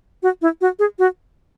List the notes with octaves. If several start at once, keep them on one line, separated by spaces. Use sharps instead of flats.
F#4
E4
F#4
G#4
F#4